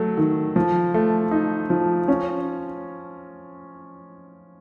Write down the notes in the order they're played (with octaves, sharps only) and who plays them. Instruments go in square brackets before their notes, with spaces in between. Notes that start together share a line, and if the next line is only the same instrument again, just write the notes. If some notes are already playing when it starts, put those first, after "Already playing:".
Already playing: [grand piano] F#3 A3
D#3
F3
A3
D#4
F3
C#4